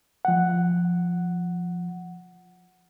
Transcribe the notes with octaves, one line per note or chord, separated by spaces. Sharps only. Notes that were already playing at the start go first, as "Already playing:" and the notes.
F3 F#5